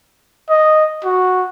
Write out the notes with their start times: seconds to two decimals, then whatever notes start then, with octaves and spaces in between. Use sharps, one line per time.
0.49 D#5
1.04 F#4